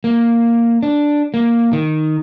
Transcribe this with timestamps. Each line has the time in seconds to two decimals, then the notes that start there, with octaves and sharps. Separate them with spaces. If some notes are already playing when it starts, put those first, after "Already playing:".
0.04 A#3
0.83 D4
1.34 A#3
1.73 D#3